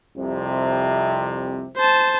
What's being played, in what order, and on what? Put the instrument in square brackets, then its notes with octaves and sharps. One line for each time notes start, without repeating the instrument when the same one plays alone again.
[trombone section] C2 F2 C3
[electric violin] C5 A5